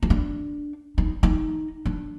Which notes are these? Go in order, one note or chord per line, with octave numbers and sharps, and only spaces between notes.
D#4
D4
D#4
D#4
D4